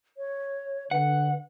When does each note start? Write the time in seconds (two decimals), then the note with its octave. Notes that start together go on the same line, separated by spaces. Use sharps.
0.17 C#5
0.91 D3 B4 F#5